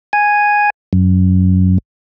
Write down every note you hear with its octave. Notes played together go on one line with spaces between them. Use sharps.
G#5
F#2